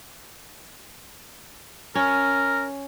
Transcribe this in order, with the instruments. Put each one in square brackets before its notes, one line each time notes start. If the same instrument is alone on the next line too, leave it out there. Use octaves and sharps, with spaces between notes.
[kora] C#4 [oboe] A#4